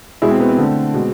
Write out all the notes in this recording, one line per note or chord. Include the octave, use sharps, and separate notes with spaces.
B2 G#3 E4 G#4
C4
B3
C4
D3 A3
B2 G#3